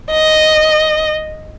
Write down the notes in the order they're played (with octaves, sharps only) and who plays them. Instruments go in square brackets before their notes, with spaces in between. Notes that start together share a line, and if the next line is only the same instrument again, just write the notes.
[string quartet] D#5